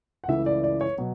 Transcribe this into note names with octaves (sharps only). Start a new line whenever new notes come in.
F#5
C#2 C#3 E3 A3 E4 E5
D5
D5
C#5
B2 F#3